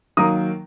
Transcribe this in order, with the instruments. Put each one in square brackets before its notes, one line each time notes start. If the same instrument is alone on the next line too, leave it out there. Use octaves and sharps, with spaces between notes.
[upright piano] D#3 F#3 A#3 [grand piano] A#5 D#6